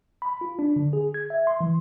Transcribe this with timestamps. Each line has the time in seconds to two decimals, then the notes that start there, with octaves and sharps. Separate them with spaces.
0.22 B5
0.41 F4
0.59 D4
0.76 D3
0.93 G#4
1.14 G#6
1.30 E5
1.47 C6
1.61 E3